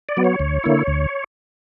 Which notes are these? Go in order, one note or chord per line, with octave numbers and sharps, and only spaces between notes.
D5
F#3 B3
C#5
D2
D3 A#3 E4
D2